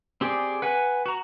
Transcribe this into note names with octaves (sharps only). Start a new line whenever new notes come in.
C4 G4 G#4 D5
B4 F#5 G#5
F#4 A#5